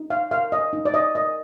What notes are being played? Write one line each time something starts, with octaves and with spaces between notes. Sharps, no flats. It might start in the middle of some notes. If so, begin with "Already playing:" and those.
Already playing: D#4
F5
A#4 F5
D#5
D#4
D5
D#5
A#4 D#5